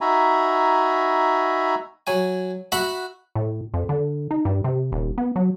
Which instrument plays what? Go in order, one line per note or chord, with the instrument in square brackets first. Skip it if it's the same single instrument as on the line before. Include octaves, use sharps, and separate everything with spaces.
[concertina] D#4 F#4 E5 G#5 A#5 B5
[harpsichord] F#3 G#5
F#4 E5 F#5 A#5 B5
[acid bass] A2
F2
D3
D#4
G2
C3
D#1
B3
F#3